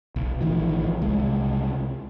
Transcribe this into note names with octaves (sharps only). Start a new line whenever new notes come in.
B1
A1 D#3 F3
C2 G#3